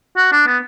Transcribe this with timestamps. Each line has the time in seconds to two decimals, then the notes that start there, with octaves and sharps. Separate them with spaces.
0.17 F#4
0.32 D4
0.47 B3